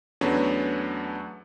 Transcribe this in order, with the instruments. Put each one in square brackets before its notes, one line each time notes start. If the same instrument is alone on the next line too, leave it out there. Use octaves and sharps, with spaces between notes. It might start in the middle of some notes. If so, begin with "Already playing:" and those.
[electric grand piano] E2 F#3 A3 B3 C#4 D4